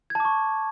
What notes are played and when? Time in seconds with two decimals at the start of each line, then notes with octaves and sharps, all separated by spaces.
0.10 G#6
0.15 A5
0.20 D6
0.25 C#6